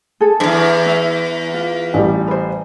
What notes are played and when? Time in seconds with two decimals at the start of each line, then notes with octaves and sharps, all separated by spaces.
0.21 G#4 A4
0.40 E2 G2
0.86 E4
1.54 F4
1.94 A1 G3
2.27 B4 C5